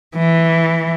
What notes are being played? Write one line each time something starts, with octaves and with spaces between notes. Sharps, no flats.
E3